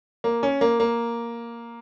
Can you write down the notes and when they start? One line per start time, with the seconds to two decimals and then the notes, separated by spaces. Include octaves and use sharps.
0.24 A#3
0.43 C#4
0.61 A#3
0.80 A#3